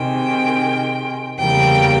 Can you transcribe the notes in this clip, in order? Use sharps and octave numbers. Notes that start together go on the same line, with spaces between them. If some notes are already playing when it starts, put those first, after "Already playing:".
Already playing: C3 D#3 G#3 G5
E2 C#3 E3 G3 A#3 G5